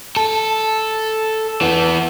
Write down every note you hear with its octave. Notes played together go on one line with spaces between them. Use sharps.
A4
E3 B3